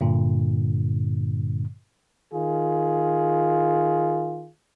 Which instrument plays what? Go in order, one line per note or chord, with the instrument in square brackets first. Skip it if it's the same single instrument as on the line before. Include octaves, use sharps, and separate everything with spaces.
[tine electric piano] G2 A#2 D3
[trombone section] D#3 F4 G#4